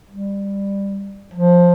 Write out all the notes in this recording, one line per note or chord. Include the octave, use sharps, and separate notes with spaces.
G3
F3